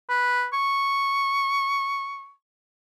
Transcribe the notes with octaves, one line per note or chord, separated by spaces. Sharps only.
B4
C#6